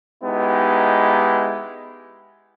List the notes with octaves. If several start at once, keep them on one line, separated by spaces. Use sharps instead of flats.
G#3 B3 D#4 E4 G4